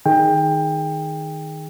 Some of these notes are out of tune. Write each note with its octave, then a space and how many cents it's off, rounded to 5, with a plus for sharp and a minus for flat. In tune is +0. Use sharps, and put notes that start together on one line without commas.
D#3 +0 G#4 +0 G5 +20